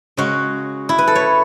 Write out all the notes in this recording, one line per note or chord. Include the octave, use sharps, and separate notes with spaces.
C#3 G#3 C#4 F#4
E4
B4
A4
C#5